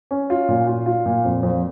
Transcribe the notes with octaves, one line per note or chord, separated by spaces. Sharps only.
C#4
F4
A#2
F4
F4
A#2
F2
F2